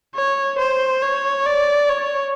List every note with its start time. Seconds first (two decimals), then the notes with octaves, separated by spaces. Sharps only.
0.15 C#5
0.59 C5
1.02 C#5
1.46 D5
1.89 C#5